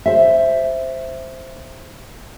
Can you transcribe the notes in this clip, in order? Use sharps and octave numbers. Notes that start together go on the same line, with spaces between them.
C5 E5